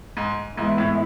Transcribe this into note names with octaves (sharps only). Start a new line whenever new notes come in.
G#2
G#2 E3 G#3 B3 E4
A2